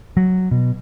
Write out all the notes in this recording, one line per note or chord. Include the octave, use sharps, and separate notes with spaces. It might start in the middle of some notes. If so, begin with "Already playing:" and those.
F#3
B2